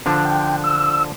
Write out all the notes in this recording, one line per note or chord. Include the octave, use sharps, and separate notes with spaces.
D3 F3 D4
G5
E6